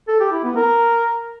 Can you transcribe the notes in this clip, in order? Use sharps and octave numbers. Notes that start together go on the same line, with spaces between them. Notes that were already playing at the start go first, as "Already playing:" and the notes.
A4
G4
E4
B3
A#4